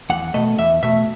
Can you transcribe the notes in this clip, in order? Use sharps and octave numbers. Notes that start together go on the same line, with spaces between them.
E2 F#5
B2 A3 D#5
E2 E5
B2 A3 E5